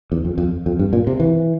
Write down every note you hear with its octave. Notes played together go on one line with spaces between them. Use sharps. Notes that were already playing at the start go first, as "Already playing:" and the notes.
E2
F2
F2
F2
G2
A#2
C3
E3